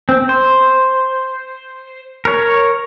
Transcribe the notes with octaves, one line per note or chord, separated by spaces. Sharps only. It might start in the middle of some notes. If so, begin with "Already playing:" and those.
C4
C5
A#4 C#5